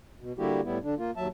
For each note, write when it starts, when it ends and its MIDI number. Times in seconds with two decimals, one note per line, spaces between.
0.19 0.32 47
0.38 0.61 50
0.38 0.61 55
0.38 0.61 58
0.38 0.61 64
0.38 0.61 66
0.38 0.61 67
0.64 0.78 45
0.64 0.78 55
0.64 0.78 59
0.64 0.78 64
0.83 0.94 50
0.83 0.94 62
0.98 1.11 58
0.98 1.11 65
1.16 1.28 39
1.16 1.28 54
1.16 1.28 76
1.16 1.28 81